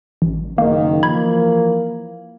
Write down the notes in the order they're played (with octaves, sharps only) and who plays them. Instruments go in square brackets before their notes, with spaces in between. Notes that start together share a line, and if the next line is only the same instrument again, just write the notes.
[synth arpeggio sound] A1
[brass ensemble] F#1 D#3 [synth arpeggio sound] A#3
[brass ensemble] E3 F3 A#3 [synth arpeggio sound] B5 G#6